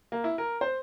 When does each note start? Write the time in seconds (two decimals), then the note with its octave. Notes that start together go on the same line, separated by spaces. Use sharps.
0.12 A#3
0.24 E4
0.38 A#4
0.61 C5